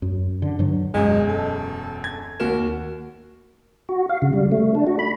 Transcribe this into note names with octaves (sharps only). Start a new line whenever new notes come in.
F#2
D3
G2 F#3
E1 F#2 G#3
A4
G#6
D#2 F#4 A#4 E7
F#4
F5
C#3
G3
A3
D4
F#4
B5